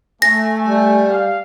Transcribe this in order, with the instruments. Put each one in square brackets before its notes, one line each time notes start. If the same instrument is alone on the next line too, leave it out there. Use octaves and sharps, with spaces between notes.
[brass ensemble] A3 [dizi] G#5 [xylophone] A#6
[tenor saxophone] G3 [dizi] G#5
[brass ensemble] F5